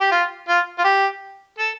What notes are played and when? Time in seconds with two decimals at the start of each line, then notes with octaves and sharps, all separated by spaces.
0.01 G4
0.12 F4
0.48 F4
0.78 F4
0.84 G4
1.58 A4